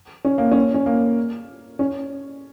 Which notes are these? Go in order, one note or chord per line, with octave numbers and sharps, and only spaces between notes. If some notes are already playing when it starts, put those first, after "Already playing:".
C#4
A#3
C#4
C#4
A#3
C#4